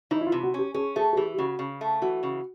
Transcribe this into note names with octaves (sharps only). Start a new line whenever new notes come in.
E3 D#4
E4
F4
C3
F#4
C#4 G4
C#4 G#4
A3 G#4
G#4
E3 G4
G4
C#3 F#4
C#3
A3
E3 F#4
C#3